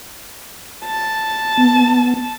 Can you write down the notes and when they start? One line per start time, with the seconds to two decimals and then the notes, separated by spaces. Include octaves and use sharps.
0.85 A5
1.57 B3